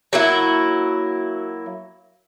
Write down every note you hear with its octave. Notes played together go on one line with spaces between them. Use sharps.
F#3 A#3 E4